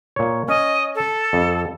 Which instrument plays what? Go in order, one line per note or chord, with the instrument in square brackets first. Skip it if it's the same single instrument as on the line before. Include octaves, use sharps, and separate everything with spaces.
[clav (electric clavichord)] A#2 C#5
[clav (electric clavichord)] C#4 [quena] D#5
[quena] A4
[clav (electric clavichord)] F2